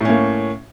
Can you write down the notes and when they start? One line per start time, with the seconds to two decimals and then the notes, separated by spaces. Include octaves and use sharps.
0.01 A2
0.05 C#4
0.09 A#3